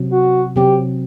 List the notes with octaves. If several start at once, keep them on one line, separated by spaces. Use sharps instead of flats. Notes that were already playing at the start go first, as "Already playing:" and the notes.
Already playing: C3 F#3 C4
F#4
C3 F#3 C4 G4